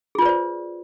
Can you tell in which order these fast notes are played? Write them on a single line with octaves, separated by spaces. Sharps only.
G#4 F4 B4 D5 C5